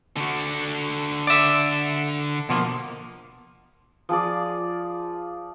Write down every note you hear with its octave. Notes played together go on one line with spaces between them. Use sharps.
D3 F#4
D5 E5
B2 F3 A#3
F3 G#4 D5